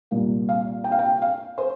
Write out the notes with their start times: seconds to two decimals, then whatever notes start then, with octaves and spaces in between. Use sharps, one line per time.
0.11 C2 A#2 A#3
0.49 F5
0.84 G5
0.92 F5
0.99 G5
1.22 F5
1.58 C5